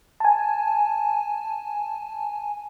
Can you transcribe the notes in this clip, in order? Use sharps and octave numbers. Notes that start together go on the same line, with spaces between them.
G#5 A5